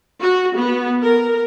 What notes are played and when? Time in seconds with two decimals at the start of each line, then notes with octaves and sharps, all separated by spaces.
0.21 F#4
0.58 B3
1.02 A#4